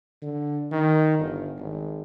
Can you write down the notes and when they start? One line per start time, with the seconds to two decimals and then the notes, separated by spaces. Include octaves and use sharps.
0.22 D3
0.72 D#3
1.19 G1
1.58 G#1